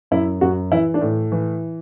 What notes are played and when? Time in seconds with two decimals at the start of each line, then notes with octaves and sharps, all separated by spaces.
0.11 F#2 E4
0.41 F#2 F#4
0.71 E3 E4
0.94 D4
1.01 A2
1.32 E3